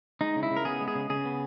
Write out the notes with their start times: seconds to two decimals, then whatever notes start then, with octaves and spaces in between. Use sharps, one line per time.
0.21 G#3 D#4
0.36 C#3
0.43 E4
0.51 C#3
0.57 A#4
0.65 B3 G#4
0.81 G#3
0.88 G#4
0.95 C#3
1.10 C#3 G#4
1.25 B3